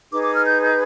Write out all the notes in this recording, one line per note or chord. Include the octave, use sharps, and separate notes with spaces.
D#4 G#4 B4 D6
D6
F6
G6
G6